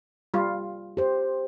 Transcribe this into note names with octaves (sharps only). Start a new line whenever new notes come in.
G3 F4
G4 C5